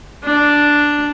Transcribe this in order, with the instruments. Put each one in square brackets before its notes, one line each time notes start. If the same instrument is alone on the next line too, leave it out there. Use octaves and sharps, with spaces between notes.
[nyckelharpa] D4